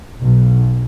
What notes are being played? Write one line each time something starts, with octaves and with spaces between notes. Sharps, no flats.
B1